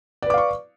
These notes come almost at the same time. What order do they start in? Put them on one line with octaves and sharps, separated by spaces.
D5 B4 D6 F5 C#6